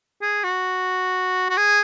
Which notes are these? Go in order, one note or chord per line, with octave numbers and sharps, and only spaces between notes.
G#4
F#4
F#4
G#4